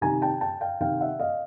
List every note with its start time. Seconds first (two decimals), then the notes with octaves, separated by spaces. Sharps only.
0.01 C3 D#3 G#5 A#5
0.22 G5 A5
0.41 G5 A5
0.61 F5 G5
0.80 C3 D#3 F5 G5
1.01 E5 F#5
1.19 D#5 F5